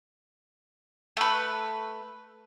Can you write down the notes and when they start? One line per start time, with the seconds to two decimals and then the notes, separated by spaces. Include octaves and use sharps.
1.17 A3 B4